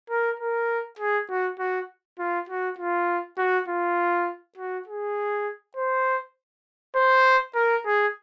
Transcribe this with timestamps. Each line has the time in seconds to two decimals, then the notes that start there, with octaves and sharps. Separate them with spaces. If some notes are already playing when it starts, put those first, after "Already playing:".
0.10 A#4
0.40 A#4
0.99 G#4
1.29 F#4
1.59 F#4
2.19 F4
2.49 F#4
2.78 F4
3.38 F#4
3.68 F4
4.58 F#4
4.87 G#4
5.76 C5
6.96 C5
7.55 A#4
7.86 G#4